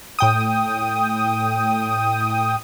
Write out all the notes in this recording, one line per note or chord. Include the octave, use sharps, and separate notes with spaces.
A2 G5 D#6